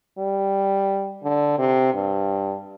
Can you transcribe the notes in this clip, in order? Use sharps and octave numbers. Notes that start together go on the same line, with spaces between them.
G3
D3
C3
G2